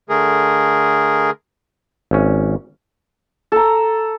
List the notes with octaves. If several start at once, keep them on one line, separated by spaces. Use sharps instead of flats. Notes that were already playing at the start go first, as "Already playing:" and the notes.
D3 A3 G#4 A#4
G#1 C#4
A4 A#5